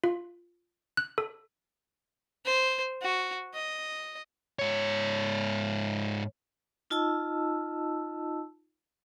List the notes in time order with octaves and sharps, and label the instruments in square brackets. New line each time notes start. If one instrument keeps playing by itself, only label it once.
[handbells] F4
F#6
A4
[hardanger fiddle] C5
F#4
D#5
[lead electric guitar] G#2 C#5
[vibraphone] D#4 F4 D#5 A5 E6